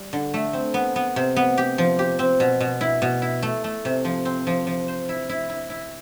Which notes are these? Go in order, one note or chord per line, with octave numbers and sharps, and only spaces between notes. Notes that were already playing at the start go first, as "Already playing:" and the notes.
Already playing: G3
D3
A3
C4
B3
B3
C3
B3
G4
F3
G4
C4
B2
B2
E4
B2
E4
A3
A3
C3
F3
C4
F3
F3
C5
E4
E4
E4
E4